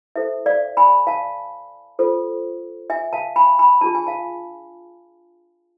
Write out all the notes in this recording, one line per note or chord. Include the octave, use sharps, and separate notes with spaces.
E4 A4 C5 E5
D5 F5
G#5 B5
F5 A5
F4 A4 C5
E5 G#5
F5 A5
G#5 B5
G#5 B5
D4 F4 G#4 A5
G#5
F5 A5